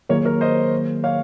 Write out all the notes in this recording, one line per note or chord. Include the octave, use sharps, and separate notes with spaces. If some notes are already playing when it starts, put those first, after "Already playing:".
D#3 F#3 A#3 F4 G#4 A#4 C#5
A#4 C#5
C5 D#5
C#5 F5